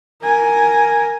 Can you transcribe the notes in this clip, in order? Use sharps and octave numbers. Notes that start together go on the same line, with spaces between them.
A#4 G#5